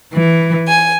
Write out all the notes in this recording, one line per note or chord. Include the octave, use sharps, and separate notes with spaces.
E3
G#5